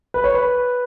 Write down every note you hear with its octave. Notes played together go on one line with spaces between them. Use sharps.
B4
C#5
B4